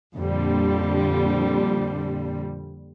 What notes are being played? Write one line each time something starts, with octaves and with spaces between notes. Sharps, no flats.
F2 A#2 D3 G3